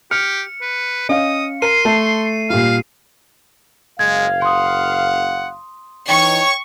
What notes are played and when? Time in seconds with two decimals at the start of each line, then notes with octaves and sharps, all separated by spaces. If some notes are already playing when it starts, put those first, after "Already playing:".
0.11 G4 F6 C#7
0.62 B4
1.09 C#4 D#5 F5 D#6
1.62 A#4 C6 C7 D#7
1.85 A3 A5
2.50 A#2 G3 F5
3.99 F#1 G#3 F5 G#6
4.42 F#5 C6 D#6
6.09 E3 D#4 C#5 G5 C#6